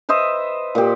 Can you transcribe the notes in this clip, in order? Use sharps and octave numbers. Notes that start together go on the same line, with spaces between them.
B4 C5 D#5 E5
A#2 G4